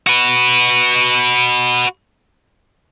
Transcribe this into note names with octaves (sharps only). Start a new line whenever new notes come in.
F#4 B4